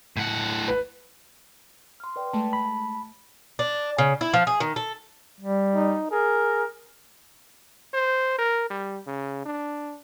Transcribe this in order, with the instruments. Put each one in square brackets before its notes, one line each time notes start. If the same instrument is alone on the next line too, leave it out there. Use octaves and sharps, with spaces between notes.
[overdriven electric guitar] A2 F#5
[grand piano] B4
[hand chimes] C6 F6
B4 D5 G5
[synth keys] G#3 A3 [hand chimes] A5
[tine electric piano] B5
[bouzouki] D4
C#3
E4
F3
G#4
D#3
A4
[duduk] G3
[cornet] D#4
[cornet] G#4 [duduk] A#4
[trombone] C5
A#4
G3
C#3
D4